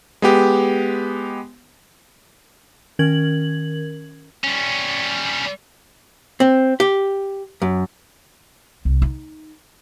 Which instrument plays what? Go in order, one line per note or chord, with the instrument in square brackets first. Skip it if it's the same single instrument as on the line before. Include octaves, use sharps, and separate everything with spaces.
[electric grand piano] G#3 B3 G4
[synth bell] D#3 C#4 A#4 G#6 F#7
[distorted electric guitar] G3 C#4
[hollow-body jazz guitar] C4
G4
F#2
[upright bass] C2
D#4